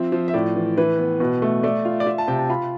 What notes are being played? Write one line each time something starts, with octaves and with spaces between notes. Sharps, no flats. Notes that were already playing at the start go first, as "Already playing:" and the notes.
Already playing: F3 C4 E5
F3
E5
A2 D5
E3
E3 B4
B3
B2
A3
A3 D5
F4
D5
F4 E5
A5
C3 G5
A5
F4 B5